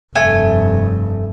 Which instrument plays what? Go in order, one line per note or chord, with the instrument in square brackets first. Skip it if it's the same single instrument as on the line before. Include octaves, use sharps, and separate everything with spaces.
[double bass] F1 G2 [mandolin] A3 G#5